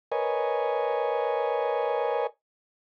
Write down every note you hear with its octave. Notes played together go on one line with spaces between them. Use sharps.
A#4 B4 C#5 D#5 G#5